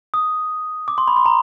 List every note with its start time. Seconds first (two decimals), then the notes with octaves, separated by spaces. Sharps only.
0.14 D#6
0.88 D6
0.98 C6
1.08 B5
1.16 C6
1.26 A#5